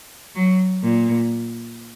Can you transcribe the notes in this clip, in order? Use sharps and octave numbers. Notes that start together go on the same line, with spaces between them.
F#3
A#2